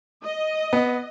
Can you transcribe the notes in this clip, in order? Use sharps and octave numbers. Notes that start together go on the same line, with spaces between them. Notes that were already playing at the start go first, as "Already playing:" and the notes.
D#5
B3